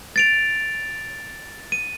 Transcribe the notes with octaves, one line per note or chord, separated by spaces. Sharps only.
A6 D7 F7
D#7